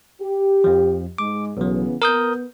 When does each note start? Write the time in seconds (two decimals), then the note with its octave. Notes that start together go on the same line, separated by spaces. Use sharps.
0.21 G4
0.64 F2 F3
1.18 G#2 G#3 D6
1.57 B1 C#3 E3 F#3 B3
2.02 B3 A#4 D#6 G6